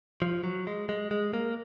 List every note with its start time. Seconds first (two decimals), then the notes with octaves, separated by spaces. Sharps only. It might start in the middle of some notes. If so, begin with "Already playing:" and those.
0.22 F3
0.44 F#3
0.67 G#3
0.89 G#3
1.11 G#3
1.33 A#3